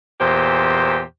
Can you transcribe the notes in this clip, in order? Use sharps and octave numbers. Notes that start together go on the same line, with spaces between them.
E2 A#2 G4 C5